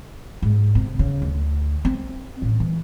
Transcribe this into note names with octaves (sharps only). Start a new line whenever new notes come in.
G#2
C3
C#3
D2
C4
A1
E3